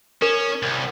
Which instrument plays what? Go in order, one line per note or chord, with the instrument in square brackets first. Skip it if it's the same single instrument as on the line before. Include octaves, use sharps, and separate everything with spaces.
[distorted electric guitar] C#4 [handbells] A#4
[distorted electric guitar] C2